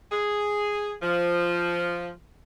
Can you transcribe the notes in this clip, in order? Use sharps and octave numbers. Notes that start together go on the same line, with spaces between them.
G#4
F3